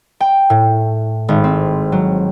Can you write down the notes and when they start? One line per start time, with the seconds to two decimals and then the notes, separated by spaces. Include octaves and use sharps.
0.20 G5
0.50 A2
1.28 G#1
1.44 C4
1.92 F#3